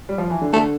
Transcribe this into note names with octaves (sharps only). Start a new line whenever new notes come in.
G3
F3
E3
D3
D3 A3